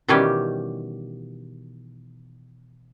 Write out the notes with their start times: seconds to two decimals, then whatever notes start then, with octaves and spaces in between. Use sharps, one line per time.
0.08 B2 D#3 E3 G3 C#4 G4